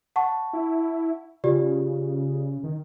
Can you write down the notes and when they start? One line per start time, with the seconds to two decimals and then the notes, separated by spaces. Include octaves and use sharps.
0.16 F#5 A5 C#6
0.53 E4
1.44 C#3 F4 G4 D5
2.64 D#3